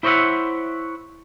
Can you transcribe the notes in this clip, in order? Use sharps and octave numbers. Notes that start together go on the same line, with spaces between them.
E4 C5 C#5 D#5 E5 F#5